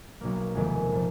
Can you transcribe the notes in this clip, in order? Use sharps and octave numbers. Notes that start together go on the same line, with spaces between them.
B1 B2 A#3
F1 D#2 D#3 G#3 B3
A#2 F3